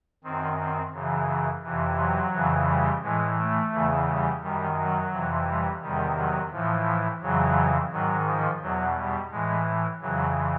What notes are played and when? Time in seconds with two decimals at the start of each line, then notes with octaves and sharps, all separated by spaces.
0.24 F#2 D#3 C4
0.58 C4
0.93 F#2 C#3 E3
1.63 F2 C3 E3
1.99 F#3
2.33 F2 C#3 E3
2.68 G3
3.02 A2 E3 G#3
3.38 A3
3.73 E2 C#3 E3
4.07 G3
4.42 F#2 D#3 G3
4.77 F#3
5.13 F2 C3 E3
5.48 G3
5.82 E2 C3 D#3 G3
6.17 F#3
6.52 A2 E3 F3
7.22 F2 C#3 E3 F#3
7.91 G#2 D#3 F#3
8.26 F3
8.61 E2 B2 F#3
8.97 G3
9.31 A2 E3 G#3
10.00 F2 C#3 E3 F#3